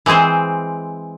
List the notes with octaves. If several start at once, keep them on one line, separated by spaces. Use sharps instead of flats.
E3 G#3 C4 G#4 C5